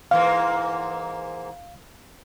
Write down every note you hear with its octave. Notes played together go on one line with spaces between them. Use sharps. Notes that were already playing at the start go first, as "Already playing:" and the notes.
G#2 E3 A#3 F5